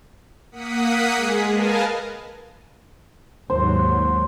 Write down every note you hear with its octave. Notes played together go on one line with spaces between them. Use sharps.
A#3 F#5 D#6 B6 C#7
G#3 G#4
A#4 B4 D#5 F5 G#5 A5
D#2 G#2 F#3 C5